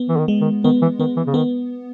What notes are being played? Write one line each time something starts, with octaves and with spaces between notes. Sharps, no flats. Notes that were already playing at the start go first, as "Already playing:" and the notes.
Already playing: B3
E3
D#3
G#3
D#3
D#3 B3
E3
D#3 B3
E3
C#3
D#3 B3